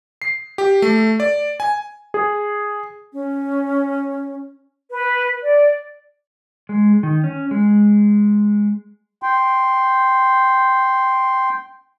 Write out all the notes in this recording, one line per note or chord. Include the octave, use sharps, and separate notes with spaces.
C7
G4
A3
D5
G#5
G#4
C#4
B4
D5
G#3
D#3
C#4
G#3
G5 C6